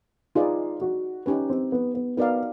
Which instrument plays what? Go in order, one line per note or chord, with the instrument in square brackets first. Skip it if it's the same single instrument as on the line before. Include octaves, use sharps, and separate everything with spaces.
[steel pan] D#4 G#4 B4 D5 [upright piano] F4
[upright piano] F#4
[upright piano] C#4 [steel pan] D#4 G4 B4
[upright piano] C4
B3
B3
[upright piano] B3 [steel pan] D#4 F#4 A#4 D5 F5